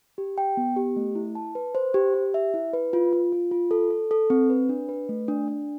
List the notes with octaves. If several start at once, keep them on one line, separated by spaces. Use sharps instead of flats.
G4
G5
B3
G4
A3
E4
A5
B4
C5
G4
G4
E5
E4
B4
F4
F4
F4
F4
A4
A4
A4
C4
B4
D4
B4
A3
D4
D4